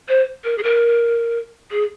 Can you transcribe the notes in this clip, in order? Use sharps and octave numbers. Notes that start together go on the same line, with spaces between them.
C5
A#4
G#4
A#4
G#4